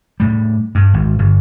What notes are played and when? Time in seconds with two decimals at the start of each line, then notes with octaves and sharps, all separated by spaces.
0.20 A2 G3
0.75 G2
0.94 G#1
1.19 G1